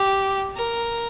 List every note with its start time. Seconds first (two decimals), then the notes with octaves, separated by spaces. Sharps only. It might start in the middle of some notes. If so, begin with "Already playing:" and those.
Already playing: G4
0.56 A#4